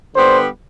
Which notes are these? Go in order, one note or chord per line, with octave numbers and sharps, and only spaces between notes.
D3 G3 B3 C5